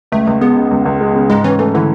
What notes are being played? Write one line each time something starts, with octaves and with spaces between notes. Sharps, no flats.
C#2 A3
C#2
G#3 B3
C#3
C#2
C#2
G#3
C#3
G#2 G#3
E3 C#4
E3 A3
D3 E3